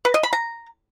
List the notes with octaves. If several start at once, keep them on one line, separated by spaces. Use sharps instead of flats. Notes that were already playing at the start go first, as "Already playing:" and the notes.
B4
D#5
B5
A#5